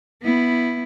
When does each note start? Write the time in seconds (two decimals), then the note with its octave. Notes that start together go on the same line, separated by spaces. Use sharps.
0.22 B3 E4